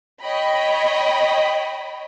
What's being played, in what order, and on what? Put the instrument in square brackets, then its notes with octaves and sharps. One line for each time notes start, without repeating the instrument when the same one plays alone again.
[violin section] C#5 D#5 G5 B5